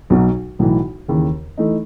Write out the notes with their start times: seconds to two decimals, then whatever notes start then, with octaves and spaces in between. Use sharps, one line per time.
0.10 B1 B2 F#3
0.59 B1 A2 E3
1.08 D#2 C#3 E3
1.58 E3 A3 D#4